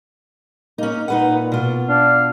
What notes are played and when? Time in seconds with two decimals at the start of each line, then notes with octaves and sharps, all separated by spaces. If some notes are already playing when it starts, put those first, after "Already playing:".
0.78 A#3 C#4 D#4
1.08 A#2 D#4 B4 F#5
1.52 B2 F4
1.88 D4 F5